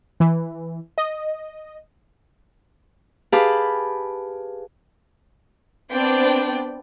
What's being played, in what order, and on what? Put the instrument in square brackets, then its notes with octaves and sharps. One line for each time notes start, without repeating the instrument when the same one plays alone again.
[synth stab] E3
D#5
[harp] G4 G#4 B4 F5 A5 B5
[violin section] B3 C4 D4 D5 G5